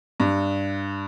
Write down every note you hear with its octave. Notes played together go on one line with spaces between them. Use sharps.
G2